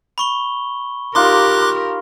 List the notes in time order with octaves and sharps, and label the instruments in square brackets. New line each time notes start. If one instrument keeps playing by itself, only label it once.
[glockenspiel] B5 C#6 G7
[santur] D#4 F4 D5 [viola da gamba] G4 A#4 [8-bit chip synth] C6 D6 F#6